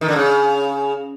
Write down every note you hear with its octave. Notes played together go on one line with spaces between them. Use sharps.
D#3
D3
C#3